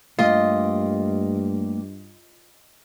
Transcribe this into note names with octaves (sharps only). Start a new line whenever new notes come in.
G2 A3 A#3 F4 G4 D#5